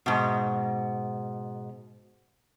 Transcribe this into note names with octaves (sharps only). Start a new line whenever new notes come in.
G#2 B2